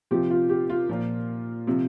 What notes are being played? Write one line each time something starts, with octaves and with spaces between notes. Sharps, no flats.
C3 F3 G4
F4
G4
F4
A#2 F3
C3 F3